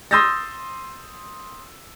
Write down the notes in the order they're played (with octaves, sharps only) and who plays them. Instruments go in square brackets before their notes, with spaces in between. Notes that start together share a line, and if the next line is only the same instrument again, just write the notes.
[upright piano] C6 D#6 E6 G6 A6 A#6